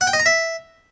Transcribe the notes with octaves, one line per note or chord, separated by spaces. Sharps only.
F#5
G5
D#5
A#5
E5